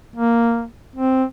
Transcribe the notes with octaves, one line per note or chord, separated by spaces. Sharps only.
A#3
C4